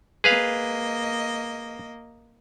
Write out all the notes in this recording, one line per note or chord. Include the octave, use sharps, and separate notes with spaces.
A#3 G#4 B4 D#5 F5